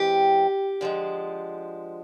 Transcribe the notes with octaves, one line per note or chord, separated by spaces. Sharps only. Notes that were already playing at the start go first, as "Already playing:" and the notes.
Already playing: E3 G#3 C4 G4
D3 F3 G#3